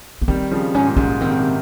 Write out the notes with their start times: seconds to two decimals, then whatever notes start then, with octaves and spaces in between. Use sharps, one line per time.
0.22 A#3
0.28 D#3 G3 C4
0.51 C#3 F3
0.74 G#2 C#4
0.87 A#2
0.96 G#2 C#4
1.21 D#3 C4
1.30 C#3
1.39 C3 D#3